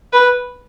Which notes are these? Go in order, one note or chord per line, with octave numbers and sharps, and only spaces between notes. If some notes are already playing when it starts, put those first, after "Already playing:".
B4